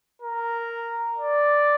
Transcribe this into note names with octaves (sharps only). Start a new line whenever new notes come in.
A#4
D5